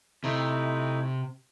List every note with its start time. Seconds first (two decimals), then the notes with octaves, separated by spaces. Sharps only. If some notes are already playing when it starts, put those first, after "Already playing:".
0.24 C3 A3 D#4 E4